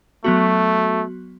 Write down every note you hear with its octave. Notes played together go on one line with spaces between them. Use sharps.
F#3 A3 B3 F#4